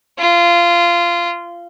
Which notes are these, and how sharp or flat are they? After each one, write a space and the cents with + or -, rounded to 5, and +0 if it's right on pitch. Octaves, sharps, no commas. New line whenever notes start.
F4 -20